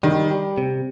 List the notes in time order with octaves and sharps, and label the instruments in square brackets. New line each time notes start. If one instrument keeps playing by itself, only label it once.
[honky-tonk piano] D#3 [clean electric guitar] G3
[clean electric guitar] G3
C3